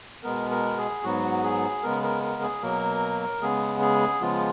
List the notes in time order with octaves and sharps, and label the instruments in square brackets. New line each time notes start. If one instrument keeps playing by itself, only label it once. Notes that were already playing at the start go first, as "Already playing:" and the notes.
[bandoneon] B2 G#3 B3 A#4
A#4
G#4
G#2 F#3 B3 F#4
G#4
C#3 G#3 B3 A#4
A#4
A#4
G#4
B2 F#3 A#3 A#4
C#3 G#3 B3 G#4
G#4
C#3 F3 G#3 B3 F4